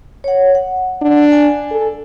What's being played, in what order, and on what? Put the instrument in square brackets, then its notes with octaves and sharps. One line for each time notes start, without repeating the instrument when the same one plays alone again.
[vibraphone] C#5 F#5
F#5
[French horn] D4
[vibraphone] G#5
[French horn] A4